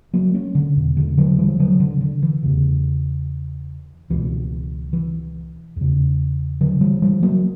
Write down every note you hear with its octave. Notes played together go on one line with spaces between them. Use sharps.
F#3 A#3
A#3 C#4
D3
E2 B2
D3
D3 F#3
E3 G3
D3 F#3
D3
D3
E3
E2 C#3
C#2 B2 E3
E3
E2 C#3
D3 F#3
E3 G3
E3 G3
F#3 A#3